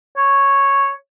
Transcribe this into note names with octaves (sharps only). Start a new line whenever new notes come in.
C#5